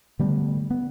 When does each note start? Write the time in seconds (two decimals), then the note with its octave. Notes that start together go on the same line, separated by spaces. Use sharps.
0.19 D3 G3 A3 B3
0.71 B3